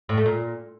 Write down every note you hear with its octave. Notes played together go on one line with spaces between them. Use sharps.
A2
A3
A#2